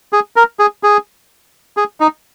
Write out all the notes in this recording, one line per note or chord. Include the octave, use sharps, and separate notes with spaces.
G#4
A#4
G#4
G#4
G#4
D#4